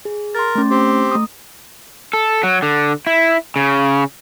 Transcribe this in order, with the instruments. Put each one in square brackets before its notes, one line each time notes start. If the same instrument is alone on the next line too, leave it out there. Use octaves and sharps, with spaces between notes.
[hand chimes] G#4
[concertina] A#4 [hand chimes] C6 A6
[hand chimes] A3 C#4
[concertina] C4 G4
[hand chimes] A3 D#6
[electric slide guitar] A4
F#3
D3
E4
C#3